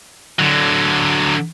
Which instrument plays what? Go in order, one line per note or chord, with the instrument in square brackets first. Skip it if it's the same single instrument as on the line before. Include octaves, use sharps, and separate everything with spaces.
[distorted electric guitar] D3 F#3